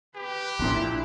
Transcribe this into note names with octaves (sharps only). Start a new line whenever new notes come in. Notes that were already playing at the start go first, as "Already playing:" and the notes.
G4 B4
A#1 A#2 C#4 D4 E4 C6 F#6